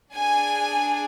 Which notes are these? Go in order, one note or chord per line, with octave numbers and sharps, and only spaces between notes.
D4 G#4 G#5